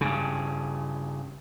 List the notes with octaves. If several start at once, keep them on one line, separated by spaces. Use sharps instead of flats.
G2 C#3